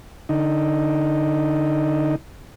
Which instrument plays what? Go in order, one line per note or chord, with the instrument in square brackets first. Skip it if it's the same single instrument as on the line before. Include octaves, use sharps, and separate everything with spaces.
[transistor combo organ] D3 D#4